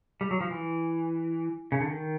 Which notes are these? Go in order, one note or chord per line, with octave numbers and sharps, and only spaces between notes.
G3
F#3
F3
E3
C#3
D3
D#3